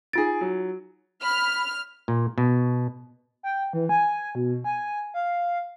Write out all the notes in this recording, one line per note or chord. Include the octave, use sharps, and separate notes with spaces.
D#4 F4 G#4 A6 D7
F#3
B5 F6
A#2
B2
G5
E3
G#5
B2
G#5
F5